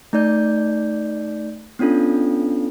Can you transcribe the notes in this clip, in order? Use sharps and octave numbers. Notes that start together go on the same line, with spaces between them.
A3 D#4 D5 G6
B3 C#4 D4 F4 A4